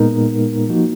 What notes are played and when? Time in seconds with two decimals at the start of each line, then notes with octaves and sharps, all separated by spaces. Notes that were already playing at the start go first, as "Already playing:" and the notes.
Already playing: A#2 G#3 B3 D#4 A#4
0.69 F3 A#3 D#4 F#4